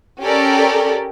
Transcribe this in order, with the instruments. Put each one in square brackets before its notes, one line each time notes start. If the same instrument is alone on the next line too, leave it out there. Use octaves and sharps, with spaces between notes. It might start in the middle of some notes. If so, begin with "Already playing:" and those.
[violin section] C#4 G4 A4 A#4 D5